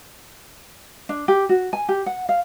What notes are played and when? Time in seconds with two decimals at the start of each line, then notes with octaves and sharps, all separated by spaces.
1.09 D4
1.28 G4
1.49 F#4
1.73 G#5
1.89 G4
2.06 F#5
2.29 F5